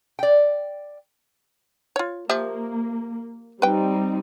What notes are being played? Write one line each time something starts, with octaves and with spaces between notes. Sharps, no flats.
D5 G5
F4 C#5
F3 A#3 G4 E5
G3 C4 D#4 B4 G5